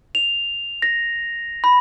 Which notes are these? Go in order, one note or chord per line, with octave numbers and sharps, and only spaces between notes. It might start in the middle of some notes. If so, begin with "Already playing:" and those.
F7
A#6
B5